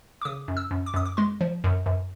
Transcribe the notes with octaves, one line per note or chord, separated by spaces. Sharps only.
D6
C#3 D#6
F#2
E6
F#2
D6
F#2 D#6
D6
G#3 C6
F3
F#2
F#2